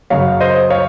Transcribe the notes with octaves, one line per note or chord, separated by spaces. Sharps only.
F#2 C#3 F#3 C#5 F5
C5 D#5
C#5 F5